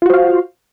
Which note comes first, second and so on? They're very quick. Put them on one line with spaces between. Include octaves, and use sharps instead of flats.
F4 F#4 C5 F5